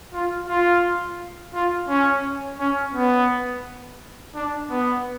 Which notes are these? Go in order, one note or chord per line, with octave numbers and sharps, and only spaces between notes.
F4
F4
F4
C#4
C#4
B3
D4
B3